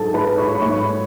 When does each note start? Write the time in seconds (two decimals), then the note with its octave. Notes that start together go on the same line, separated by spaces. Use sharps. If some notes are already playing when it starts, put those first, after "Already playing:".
Already playing: G#2 F#3 G#4 A4 A5
0.14 B4 B5
0.37 C#5 C#6
0.55 B5
0.61 G#2 F#3 C#5 C#6